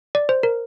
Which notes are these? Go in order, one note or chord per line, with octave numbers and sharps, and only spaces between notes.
D5
C5
A#4